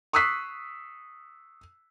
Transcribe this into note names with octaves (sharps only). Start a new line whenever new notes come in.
C#6 D#6 E6 F#6 B6 C7